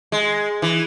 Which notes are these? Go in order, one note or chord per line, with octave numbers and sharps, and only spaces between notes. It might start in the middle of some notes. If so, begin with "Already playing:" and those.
G#3
E3